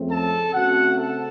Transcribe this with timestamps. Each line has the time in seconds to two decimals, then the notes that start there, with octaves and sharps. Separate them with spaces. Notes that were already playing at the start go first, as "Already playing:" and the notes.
Already playing: F2 C#3 A3 C4
0.10 A4 A5
0.54 C#3 A3 C4 F#4 F#5
0.98 A4 A5